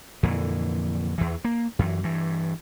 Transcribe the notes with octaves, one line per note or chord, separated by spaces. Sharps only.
F2 A#2 D3 E3
E2 E3
A#3
F#2 E3
G2 E3